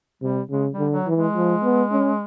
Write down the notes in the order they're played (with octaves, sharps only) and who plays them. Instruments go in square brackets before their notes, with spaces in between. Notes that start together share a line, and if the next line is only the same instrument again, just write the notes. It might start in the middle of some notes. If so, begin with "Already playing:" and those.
[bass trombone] C3 [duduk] G3
[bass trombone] C#3 [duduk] G#3
[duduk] G3
[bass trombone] D3
[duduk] F#3
[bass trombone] E3
[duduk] G#3
[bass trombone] F3
B3
C#4